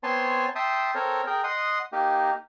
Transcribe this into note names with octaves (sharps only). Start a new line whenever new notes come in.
B3 C4 C#5 G#5 A5 C6
E5 G5 A5 C6 D#6
C4 A4 A#4 C#5
G#4 A#4 G5
D#5 F#5 C6 D#6
A#3 D#4 G4